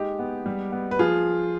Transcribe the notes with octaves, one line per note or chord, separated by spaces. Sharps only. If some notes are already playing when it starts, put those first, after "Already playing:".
Already playing: G#3 D#4 G4
B3
G3
B3
B4
F3 F4 G#4